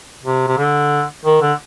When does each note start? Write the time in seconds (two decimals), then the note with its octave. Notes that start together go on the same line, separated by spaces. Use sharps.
0.23 C3
0.47 C3
0.57 D3
1.25 D#3
1.42 D3